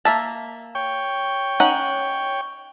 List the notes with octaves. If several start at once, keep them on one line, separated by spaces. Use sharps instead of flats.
A#3 E5 A5
C#5 G5
C#4 D#4 F#5